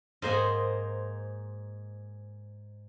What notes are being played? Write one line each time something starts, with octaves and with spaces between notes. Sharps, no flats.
G#2 A#3 C5 D#5 F#5 G#5